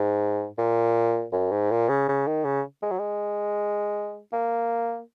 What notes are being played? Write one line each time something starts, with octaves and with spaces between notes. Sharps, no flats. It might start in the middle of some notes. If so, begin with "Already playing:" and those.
Already playing: G#2
A#2
F#2
G#2
A#2
C#3
C#3
D#3
C#3
G#3
F#3
G#3
A#3